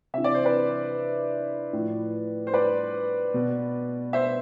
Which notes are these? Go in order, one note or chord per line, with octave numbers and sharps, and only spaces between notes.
C3 E3 E5
D5
C5
B4 D5
A2 F3
C5
B4 D5
B2
C5 E5